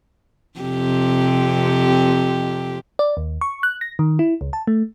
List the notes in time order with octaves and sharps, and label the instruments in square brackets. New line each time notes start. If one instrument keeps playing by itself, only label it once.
[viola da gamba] F2 C3 G4
[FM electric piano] D5
D#2
C#6
F#6
A#6
D#3
E4
C#2
A5
A3